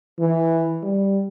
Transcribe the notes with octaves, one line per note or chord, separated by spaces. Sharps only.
E3
G3